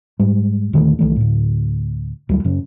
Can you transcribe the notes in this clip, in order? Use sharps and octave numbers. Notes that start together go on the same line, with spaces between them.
G#2 G3 G#3
D#1 D3 D#3 A3
C2 D#3 E3 A3
D2 A2
D2 F#3 G3
F#2 C#3 C#4